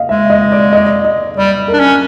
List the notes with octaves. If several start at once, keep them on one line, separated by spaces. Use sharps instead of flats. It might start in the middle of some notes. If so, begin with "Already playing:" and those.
Already playing: D#5 F5
G#3 E5
D#5
D5
D#5
D#5
G3 D5
A#4
D4
C#4